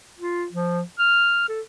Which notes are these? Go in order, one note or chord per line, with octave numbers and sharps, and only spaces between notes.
F4
F3
F6
A4